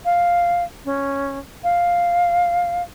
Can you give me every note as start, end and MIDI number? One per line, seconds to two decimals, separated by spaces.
0.05 0.64 77
0.85 1.39 61
1.64 2.82 77